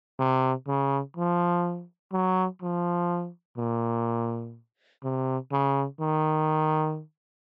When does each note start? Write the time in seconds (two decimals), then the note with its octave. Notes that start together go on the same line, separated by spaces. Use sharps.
0.19 C3
0.67 C#3
1.17 F3
2.13 F#3
2.62 F3
3.57 A#2
5.04 C3
5.51 C#3
6.00 D#3